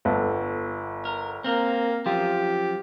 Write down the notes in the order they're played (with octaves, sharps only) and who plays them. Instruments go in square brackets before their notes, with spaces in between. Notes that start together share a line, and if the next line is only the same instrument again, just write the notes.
[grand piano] G1 B3 A4
[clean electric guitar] A#4
[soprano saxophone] A#3 [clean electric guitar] C4 A#4
[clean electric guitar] F#2 F3 [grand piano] F4 [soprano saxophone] G4